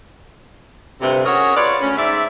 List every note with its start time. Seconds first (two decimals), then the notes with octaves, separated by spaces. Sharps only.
1.02 D2 G2 C3
1.25 C#4 F#4 G#4 A#4 C#5
1.57 F4 B4 C#5 D5
1.82 D2 C#4
1.98 G#2 D5 E5